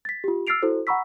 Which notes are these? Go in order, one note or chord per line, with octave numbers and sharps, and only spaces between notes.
A6 B6
F4 G4
E6 F6 A6 C7 D7 F7
E4 F#4 A4 C5
F#5 A#5 B5 C#6 E6 B6